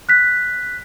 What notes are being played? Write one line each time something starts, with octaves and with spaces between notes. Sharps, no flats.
F#6 B6